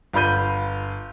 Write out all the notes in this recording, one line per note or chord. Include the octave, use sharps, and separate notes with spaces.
G1 F4 B5 G6 D#7